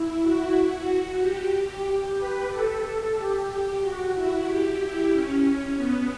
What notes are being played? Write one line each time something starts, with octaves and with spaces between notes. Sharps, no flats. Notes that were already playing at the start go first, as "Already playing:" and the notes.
Already playing: E4
F#4
G4
G4
B4
A4
A4
G4
F#4
E4
G4
E4
C#4
B3